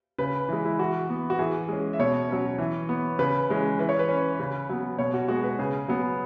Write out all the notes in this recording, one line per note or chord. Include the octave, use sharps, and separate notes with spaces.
C#3 B4
E3 G#3
E4
E3 F#4
B3
F#4
E3 G#4
G#3 C#4
E5
B2 C#5
F#3 C#4
E3
B3
C#3 B4
E3 G#3 C#4
E3 B4
C#5
B4
C#4
C#3
F#3 B3
B2 C#5
F#4
G#3 B3 F#4
B4
C#3 G#4
F#3 B3